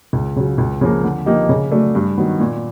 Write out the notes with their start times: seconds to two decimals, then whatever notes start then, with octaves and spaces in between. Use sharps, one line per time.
0.13 C#2
0.36 C#3 F#3
0.58 C#2
0.81 C#3 F3 A#3
1.04 D3
1.26 F3 A#3 D#4 G4
1.49 C#3
1.71 F#3 A3 D4
1.95 G2
2.17 D#3 F#3 B3
2.39 A#2